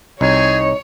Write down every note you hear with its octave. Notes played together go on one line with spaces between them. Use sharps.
C2 C4 D#4 G#4 C#5 G#5